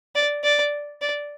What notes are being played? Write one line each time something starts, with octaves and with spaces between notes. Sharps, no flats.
D5
D5
D5